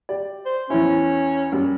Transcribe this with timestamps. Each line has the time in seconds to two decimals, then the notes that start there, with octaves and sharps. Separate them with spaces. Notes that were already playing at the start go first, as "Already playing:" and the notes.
0.09 G4 D5
0.46 C5
0.70 E2 C#4 E4
1.52 F#2 G3